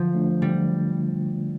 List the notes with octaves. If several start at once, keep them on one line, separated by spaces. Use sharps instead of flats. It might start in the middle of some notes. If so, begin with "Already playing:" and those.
Already playing: D3 F3
A3 D4 F4
D3 G3